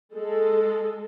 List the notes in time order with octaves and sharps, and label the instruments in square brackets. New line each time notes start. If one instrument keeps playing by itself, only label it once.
[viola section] G#3 A4